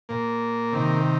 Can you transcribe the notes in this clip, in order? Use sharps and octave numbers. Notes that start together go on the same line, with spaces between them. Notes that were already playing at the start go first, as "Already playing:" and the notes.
A#2 A#3
C3 D#3